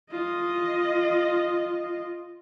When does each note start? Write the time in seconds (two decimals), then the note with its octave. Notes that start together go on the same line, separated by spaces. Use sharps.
0.11 F4 D#5